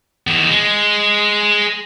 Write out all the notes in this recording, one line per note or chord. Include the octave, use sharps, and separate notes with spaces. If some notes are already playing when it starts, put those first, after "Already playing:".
E2 D#3
G#3